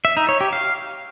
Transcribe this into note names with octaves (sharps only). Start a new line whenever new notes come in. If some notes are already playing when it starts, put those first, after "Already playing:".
E5
D#4
C#5
G4
F5